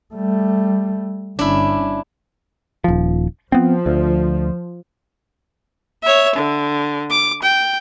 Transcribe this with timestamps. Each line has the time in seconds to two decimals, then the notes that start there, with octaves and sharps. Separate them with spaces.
0.14 G3 A3
1.39 G1 C#4 D4 E4
2.84 D#1 F3
3.52 F3 B3 C4
3.86 D2
6.03 C#5 E5
6.36 D3
7.10 D6
7.43 G5